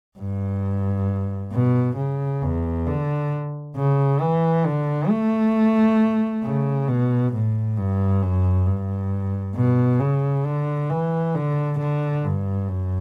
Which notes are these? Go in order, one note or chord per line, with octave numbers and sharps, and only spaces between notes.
G2
B2
C#3
E2
D3
C#3
E3
D3
A3
C#3
B2
A2
G2
F#2
G2
B2
C#3
D3
E3
D3
D3
G2
F#2